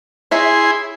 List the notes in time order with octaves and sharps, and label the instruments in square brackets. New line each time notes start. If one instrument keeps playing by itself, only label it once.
[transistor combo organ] E4 G#4 C6 [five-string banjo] C#5 E5 A#5